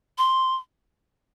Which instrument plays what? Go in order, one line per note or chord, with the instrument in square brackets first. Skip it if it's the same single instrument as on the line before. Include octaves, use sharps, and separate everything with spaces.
[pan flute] C6